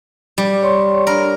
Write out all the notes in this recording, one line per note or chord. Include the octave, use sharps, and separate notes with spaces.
G3
C#5 C6 C#6
D4 A#4 B5